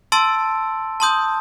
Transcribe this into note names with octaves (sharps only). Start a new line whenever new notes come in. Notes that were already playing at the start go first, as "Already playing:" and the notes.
A5 C6 E6 A6 D7
A5 C6 D#6 G6